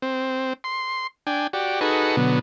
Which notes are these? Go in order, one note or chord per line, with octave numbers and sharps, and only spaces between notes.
C4
C6
D4 G5 G#5
F#4 G4 D5
D#4 F#4 G#4 A4 B4 C#6
B2 D3 F#3 B3